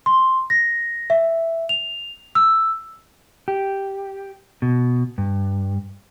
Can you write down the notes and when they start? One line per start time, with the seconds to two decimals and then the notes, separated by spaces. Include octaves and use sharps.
0.06 C6
0.50 A#6
1.10 E5
1.69 F7
2.35 E6
3.48 G4
4.62 B2
5.18 G2